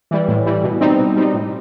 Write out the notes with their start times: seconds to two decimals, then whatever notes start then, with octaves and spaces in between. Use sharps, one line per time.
0.11 E3 G3
0.28 A2
0.46 E3 G3
0.64 B2
0.81 G3 C4 D#4
0.99 B2
1.16 G3 C4 D#4
1.34 A2